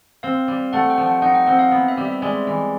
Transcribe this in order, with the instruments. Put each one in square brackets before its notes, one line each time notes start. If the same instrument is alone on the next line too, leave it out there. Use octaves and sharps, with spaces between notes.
[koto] C4 [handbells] F5
[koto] G3
[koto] A3 [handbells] F#5
[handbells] G5
[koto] F3
[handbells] F#5
[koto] D#4 [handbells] F#5
[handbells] G5
[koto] C4 [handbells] F#5
[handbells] F5
[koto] B3
[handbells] E5
[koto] G3
[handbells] E5
[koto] G#3 [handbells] D5
[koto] E3